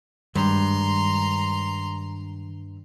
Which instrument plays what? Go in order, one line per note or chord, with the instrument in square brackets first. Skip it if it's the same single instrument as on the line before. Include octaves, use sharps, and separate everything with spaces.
[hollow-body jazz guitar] G2 [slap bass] D#3 G#3 [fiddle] A#5 C6